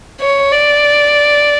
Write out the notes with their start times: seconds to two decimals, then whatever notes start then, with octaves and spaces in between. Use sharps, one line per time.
0.21 C#5
0.52 D5